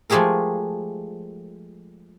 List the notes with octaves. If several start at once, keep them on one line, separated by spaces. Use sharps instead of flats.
F3 G#3 A3 G4 G#4 A#4